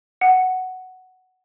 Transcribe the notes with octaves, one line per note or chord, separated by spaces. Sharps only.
F#5